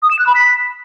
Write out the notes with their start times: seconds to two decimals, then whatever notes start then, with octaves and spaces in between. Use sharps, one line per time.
0.03 D#6
0.11 E7
0.19 F#6
0.27 B5
0.35 B6